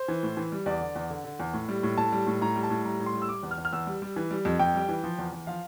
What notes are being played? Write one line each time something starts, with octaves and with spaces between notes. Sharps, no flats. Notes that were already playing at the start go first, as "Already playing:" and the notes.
Already playing: C5
E3
A2
E3
G3
E2 D5
D3
E2
D3
D3
E2
A2
G3
A2
A2 A5
G3
A2
A2 A#5
G3
A5
A2
G3 A#5
A2
C6
G3
E6
G3 D6
E2
F6
E2
F6
E2 E6
G3
G3
E3
G3
F2
F2 G5
G3
E3
F3
E2
E2
F3 F5